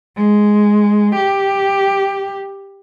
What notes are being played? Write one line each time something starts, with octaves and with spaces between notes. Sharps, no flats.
G#3
G4